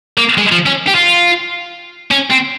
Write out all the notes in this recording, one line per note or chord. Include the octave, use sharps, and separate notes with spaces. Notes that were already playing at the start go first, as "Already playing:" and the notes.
A#3
G#3
F3
C#4
G4
F4
C#4
C4